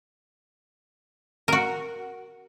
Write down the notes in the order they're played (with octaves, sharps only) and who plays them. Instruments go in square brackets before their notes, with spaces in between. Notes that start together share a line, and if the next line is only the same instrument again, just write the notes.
[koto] F#4 A#4